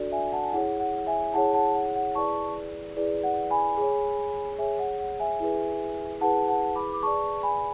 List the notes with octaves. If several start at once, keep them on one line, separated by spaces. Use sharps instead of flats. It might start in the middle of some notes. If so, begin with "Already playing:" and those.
Already playing: D4 F#4 A4 D5
E5 G#5
F#5 A5
G#5
E4 G#4 C#5 F#5
F#5
E5 G#5
E4 G#4 C#5 F#5 A5
F#5 A5
F#5
F#5
E4 G#4 B4 D5 A5 C#6
E4 G#4 B4 D5
F#5
G#5 B5
G#4 C#5
G#4 C#5 E5 G#5
F#5
F#5
E5 G#5
E4 G#4 B4
E4 G#4 B4 F#5 A5
F#5 A5
B5 D6
D6
G#4 B4 D5 A5 C#6
G#5 B5